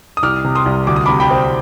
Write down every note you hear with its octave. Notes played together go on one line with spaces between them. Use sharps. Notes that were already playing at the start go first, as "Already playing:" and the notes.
D#6
C2 D6 F6
C3
C6 D#6
C2
D2 D6
D#6
C3 B5 D6
G5 B5
C4